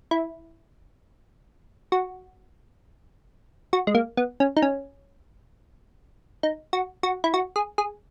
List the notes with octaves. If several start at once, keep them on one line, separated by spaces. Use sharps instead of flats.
E4
F#4
F#4
G#3
A#3
B3
C#4
D#4
C#4
D#4
F#4
F#4
E4
F#4
G#4
G#4